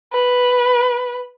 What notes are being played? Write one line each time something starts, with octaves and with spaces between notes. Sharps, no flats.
B4